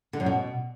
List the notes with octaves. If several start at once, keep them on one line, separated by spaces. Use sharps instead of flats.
D3
F#2
B2